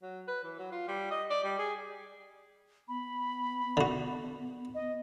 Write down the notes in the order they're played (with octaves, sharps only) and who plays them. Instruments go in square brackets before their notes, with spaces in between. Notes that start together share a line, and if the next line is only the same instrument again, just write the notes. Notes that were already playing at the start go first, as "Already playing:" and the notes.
[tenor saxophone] F#3
B4
E3
F#3
F4
G3
D#5
D5
G3
G#4
[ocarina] B3 [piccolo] B5
[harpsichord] D3 F#4
[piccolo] D#5